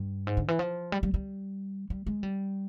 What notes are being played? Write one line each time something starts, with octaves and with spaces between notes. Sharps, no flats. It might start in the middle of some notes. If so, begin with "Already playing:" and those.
Already playing: G2
G#2
D3
E3
F3
G3
G3
G3
G3
G#3
G3